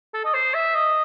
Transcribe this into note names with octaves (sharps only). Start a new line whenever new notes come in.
A4
D#5
C5
E5
D#5